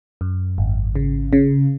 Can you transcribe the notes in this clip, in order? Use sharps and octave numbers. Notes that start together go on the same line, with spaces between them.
F#2
G#1
C#3
C#3